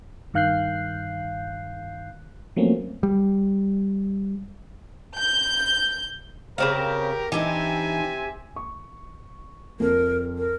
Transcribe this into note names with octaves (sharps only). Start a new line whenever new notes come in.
G2 D#3 F5 F#6 G6 C7
F3 F#3 A3 A#3 C4 C#4
G3
G6
C#3 B3 C4 G4 A#4 F5
E3 C4 D4 D#4 G4 E5 G#5
C#6
F2 A#4
A#4